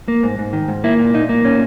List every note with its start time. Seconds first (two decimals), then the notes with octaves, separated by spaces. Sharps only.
0.08 A#3
0.23 G#2
0.39 G#2
0.53 D#3
0.68 G#2
0.84 A#3 E4
0.99 A#2
1.14 A#2 D#4
1.29 A#3
1.45 A#2 C#4